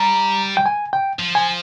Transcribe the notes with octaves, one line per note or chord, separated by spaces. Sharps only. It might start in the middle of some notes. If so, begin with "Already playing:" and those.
Already playing: G3 A#5
G5
G#5
G5
F3
G#5